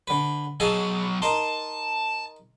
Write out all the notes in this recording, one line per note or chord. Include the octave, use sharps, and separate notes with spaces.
D3 B4
B1 F#3 G#4 A4 D#5
D#4 A#4 A5 C6